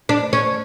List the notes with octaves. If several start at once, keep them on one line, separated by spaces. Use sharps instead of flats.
D4
C#4